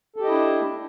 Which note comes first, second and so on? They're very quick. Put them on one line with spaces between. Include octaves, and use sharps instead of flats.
A4 G4 D#5 E4 D4